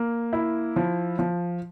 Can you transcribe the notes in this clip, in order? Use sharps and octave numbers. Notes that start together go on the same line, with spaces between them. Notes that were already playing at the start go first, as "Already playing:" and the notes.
Already playing: A#3
E4
F3
F3